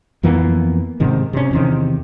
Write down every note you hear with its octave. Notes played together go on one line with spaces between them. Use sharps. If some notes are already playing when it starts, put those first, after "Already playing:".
F2 E3 A#3 B3
G#2 C3 D#3
C3 C#4
E2 C3 D#3